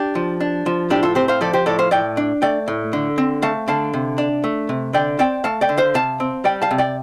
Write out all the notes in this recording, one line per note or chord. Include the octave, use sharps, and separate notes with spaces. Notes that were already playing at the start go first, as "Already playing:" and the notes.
Already playing: D4 G4
F3
D4
F3
A2 D4 G4
F4 A4
C4 G4 C5
C5 F5
F3 A4 D5
G4 C5
A2 A4 D5
C5 F5
A2 D5 G5
D4
A3 D5 G5
A2
D3
C4
A3 F5 A5
D3 F5 A5
C3
D4
A3
C3
D3 D5 G5
C4 D5 G5
A3 F5 A5
D5 G5
D3
C5 F5
C3 F5 A5
C4
G3 D5 G5
F5 A5
C3
D5 G5